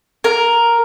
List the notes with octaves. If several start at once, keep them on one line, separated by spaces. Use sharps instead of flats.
A#4